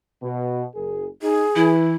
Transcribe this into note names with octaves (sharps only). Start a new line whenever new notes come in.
B2
F#1 G#4 A#4
D#4 G#4
E3 E4